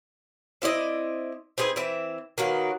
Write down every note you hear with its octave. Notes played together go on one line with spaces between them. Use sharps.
C4 E4 D5 D#5
C4 D#4 G#4 B4
E3 C4 E5
D#3 F#3 A#3 B4